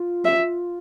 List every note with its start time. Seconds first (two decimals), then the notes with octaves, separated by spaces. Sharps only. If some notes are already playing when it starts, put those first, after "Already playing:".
Already playing: F4
0.25 E5